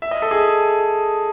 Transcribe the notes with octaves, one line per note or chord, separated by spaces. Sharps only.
E5
D#5
A4
G#4